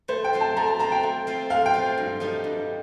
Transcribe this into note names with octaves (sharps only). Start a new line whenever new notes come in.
A3 C5
G5
C4 F4 C5
A5
A3 A#5
A5
C4 F4 C5 A#5
G5
A3
C4 F4 C5
A3 F5
G5
C4 F4 C5
G2
F3 A3 D#4 G4
G2